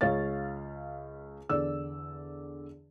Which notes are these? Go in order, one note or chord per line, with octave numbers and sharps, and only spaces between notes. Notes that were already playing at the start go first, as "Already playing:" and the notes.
C#2 C#5 F5 A6
E2 D3 D5 E6